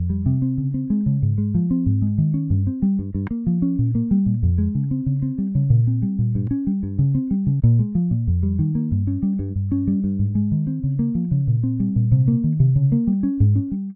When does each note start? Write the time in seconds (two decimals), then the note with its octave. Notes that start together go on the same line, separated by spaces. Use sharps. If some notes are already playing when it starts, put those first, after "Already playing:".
Already playing: F2
0.10 G3
0.26 C3
0.42 C4
0.58 C#3
0.74 C4
0.90 G#3
1.06 C#3
1.22 G#2
1.38 G#3
1.55 F3
1.71 C4
1.86 G#2
2.02 G#3
2.18 D#3
2.34 C#4
2.50 G2
2.67 C4
2.82 G3
2.99 G2
3.14 G2
3.31 A#3
3.47 F3
3.62 C#4
3.79 A#2
3.95 A#3
4.11 G3
4.26 A#2
4.43 F2
4.58 G#3
4.75 C#3
4.91 C4
5.06 C#3
5.22 C4
5.38 G3
5.55 C#3
5.70 A#2
5.87 C4
6.02 G3
6.19 A#2
6.35 G2
6.51 C#4
6.67 G3
6.83 G2
6.99 C#3
7.15 C4
7.31 G3
7.47 C#3
7.63 A#2
7.79 G#3
7.95 F3
8.11 A#2
8.27 F2
8.43 G3
8.59 D#3
8.75 A#3
8.92 G2
9.07 C#4
9.23 G3
9.39 G2
9.55 G2
9.72 C#4
9.87 G3
10.04 G2
10.19 G#2
10.35 G#3
10.52 D#3
10.67 C4
10.83 C#3
10.99 A#3
11.15 F3
11.31 C#3
11.47 A#2
11.63 C4
11.80 G3
11.96 A#2
12.12 C3
12.28 A#3
12.44 D#3
12.60 C3
12.76 C#3
12.92 A#3
13.07 G3
13.23 C#4
13.40 G#2
13.55 C#4
13.72 G3